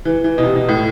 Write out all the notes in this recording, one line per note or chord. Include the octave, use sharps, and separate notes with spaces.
E3
E3
B2
C3
B2
A2